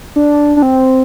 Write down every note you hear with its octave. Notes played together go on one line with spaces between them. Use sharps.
D4
D4
C4